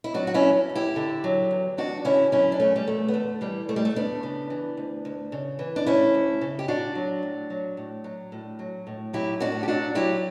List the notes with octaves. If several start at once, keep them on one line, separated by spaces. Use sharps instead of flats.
E4
F#3 D4 F#4
F#4
C#4 E4
E2
E2
E4 G4
D3
F#3
E2
E2 D4 F#4
D3 C#4 E4
F#3 C#4 E4
D4
E2 A3 C#4
G3
E2 A3
B3
D3 A3
E3 G3
D2 A3
G3
A3
D2 B3 D4
C#3
E3
D2
D2
C#3
E3
D4
D2 C#4 E4
D2
C#3
G4
A2 D4 F#4
F#3
A2
F#3
A2
F#3
A2
F#3
A2
F#3 E4 G4
A2 D4 F#4
G4
F#3 D4 F#4
F#3 E4 G4